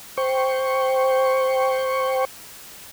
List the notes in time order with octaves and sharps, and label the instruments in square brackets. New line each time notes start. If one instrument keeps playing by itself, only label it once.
[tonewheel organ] C5 G5 C#6